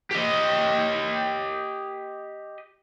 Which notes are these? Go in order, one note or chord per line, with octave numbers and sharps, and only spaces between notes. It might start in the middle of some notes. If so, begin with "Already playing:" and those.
G4 D#5